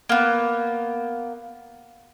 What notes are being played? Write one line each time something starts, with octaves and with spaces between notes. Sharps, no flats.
A#3 B3